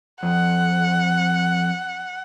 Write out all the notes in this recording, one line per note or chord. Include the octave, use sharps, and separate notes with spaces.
F2 F#5